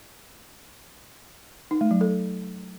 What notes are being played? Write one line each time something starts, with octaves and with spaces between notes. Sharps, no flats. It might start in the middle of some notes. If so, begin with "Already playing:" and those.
D#4
A3
F#3
A4